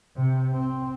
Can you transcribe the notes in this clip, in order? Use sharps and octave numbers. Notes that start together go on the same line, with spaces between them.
C3
C4